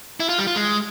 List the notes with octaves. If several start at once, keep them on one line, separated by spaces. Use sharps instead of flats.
E4
F4
G3
F4
G#3